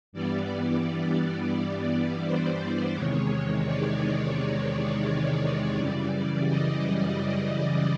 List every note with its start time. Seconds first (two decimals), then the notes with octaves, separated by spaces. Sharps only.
0.13 G2 E3 G3 B3 D5
1.54 D5
2.24 C5
2.95 E2 C3 D#3 G#3 C#5
3.66 D5
4.36 D5
5.78 F#2 C#3 E3 G3 D5
6.47 D#5